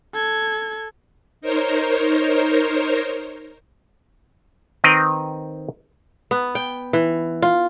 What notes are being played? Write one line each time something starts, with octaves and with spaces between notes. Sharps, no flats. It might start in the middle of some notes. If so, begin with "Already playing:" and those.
A4 G#6
D#4 A#4 C5 C#5
D#3 C4 A#4 B4 D#5
B3
G5
E3
F4